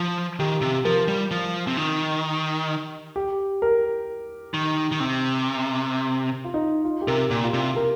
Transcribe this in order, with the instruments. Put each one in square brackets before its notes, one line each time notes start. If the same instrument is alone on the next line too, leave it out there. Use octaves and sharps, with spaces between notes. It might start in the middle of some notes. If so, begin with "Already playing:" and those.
Already playing: [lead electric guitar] F3 [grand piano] F4
[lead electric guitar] D#3 [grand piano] G4
[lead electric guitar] C3
[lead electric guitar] F3 [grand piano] A#4
[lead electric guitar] G3
F3
C3
D#3
[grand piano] G4
A#4
[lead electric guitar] D#3
D#3
C3
[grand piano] F4
D#4
F4
G4
[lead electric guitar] C3 [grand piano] A#4
[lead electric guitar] A#2 [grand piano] G4
[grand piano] F4
[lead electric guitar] C3 [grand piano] G4
[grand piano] A#4